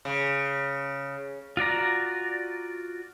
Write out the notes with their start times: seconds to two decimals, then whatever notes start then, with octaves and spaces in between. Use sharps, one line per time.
0.05 C#3
1.57 F4 F#4 D5 A#5